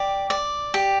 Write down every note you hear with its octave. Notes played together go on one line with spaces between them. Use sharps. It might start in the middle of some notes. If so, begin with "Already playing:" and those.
Already playing: G4 D5
D5
G4